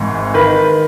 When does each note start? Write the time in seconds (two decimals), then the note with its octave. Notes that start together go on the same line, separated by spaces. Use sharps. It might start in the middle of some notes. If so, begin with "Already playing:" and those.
Already playing: G#1 G#2 E3
0.34 D#3 B4